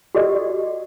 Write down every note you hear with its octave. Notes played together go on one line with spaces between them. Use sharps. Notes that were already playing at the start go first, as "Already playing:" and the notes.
F#4 G4 A4 D5 D#5